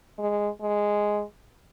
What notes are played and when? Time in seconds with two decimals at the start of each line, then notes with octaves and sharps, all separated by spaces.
0.18 G#3
0.61 G#3